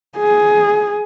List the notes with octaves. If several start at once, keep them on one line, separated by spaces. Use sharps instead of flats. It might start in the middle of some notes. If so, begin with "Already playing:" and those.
G#4